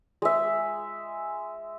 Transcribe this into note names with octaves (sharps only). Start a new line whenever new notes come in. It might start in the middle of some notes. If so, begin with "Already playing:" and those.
G#3 E5